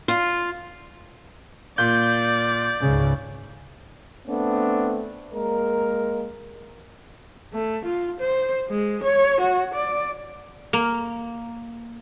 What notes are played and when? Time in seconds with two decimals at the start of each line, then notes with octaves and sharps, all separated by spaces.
0.08 F4
1.78 A#2 D5 G6
2.82 C#2 G#2 C#3
4.28 A3 B3 C4 D4
5.33 G#3 A#3 A#4
7.54 A3
7.85 F4
8.20 C5
8.70 G#3
9.03 C#5
9.40 F#4
9.74 D5
10.73 A#3